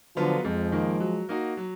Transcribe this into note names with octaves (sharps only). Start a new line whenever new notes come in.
D3 F3 F#3 B3 F4
F2 F3 G#3
D#3 A#3
F#3
A#3 D#4 F#4
F#3